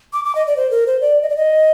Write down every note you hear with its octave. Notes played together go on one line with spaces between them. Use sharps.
D6
D6
D#5
D5
C5
A#4
C5
D5
D#5
D5
D#5